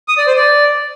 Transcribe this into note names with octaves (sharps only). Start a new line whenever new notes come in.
D#6
D5
C5
D5